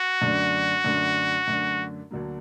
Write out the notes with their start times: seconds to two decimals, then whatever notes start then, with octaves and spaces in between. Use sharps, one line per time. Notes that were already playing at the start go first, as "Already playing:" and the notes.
Already playing: F#4
0.22 F#2 D3 A3 D4
0.84 F#2 D3 A3 D4
1.48 F#2 D3 A3 D4
2.11 D2 D3 F#3 A#3